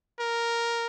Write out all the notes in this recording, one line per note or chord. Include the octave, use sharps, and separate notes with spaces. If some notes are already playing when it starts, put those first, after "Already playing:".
A#4